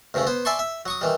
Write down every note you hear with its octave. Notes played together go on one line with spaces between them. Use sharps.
D2 G2 C#3 A3
B3 C5
D5 E5 G#5 A5 C6 C#6
E5
F#3 C#6 D#6
D#3 E3 G3